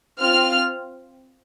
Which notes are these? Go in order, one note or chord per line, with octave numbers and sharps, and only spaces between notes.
C4 F4 F6